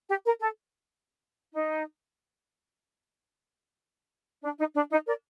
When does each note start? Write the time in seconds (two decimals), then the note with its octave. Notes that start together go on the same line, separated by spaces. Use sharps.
0.09 G4
0.25 A#4
0.41 A4
1.53 D#4
4.42 D4
4.58 D#4
4.75 D4
4.91 D#4
5.07 A#4 D5